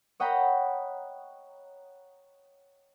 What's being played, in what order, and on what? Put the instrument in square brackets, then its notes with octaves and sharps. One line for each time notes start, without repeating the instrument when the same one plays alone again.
[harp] C#5 D#5 F#5 G5 A#5 B5